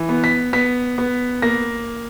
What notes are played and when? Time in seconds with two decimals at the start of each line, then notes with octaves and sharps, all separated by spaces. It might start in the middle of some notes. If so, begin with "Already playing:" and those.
Already playing: E3
0.09 B3
0.24 B6
0.53 B3 B6
0.98 B3
1.42 A#3 A#6